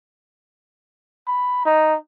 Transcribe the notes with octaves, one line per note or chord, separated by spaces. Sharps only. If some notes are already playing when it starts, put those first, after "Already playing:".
B5
D#4